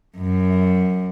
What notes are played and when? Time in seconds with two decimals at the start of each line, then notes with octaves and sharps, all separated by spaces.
0.17 F#2